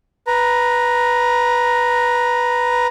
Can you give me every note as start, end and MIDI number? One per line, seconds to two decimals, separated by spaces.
0.27 2.87 71
0.27 2.87 82